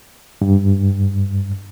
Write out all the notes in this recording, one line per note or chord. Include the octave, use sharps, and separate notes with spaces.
G2